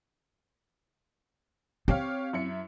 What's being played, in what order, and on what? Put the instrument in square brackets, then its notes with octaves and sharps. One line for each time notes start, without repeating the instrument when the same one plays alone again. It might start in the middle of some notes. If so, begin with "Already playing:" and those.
[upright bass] C4 [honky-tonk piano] G4 C#5 F5
[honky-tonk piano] F#2 E4 C#7